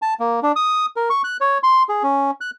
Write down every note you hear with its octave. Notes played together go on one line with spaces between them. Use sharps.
A5
A#3
D4
D#6
A#4
C#6
F#6
C#5
C6
G#4
C#4
F#6